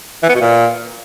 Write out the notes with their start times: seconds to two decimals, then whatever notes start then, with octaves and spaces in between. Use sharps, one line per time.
0.23 E3
0.29 B3
0.35 B2
0.41 A#2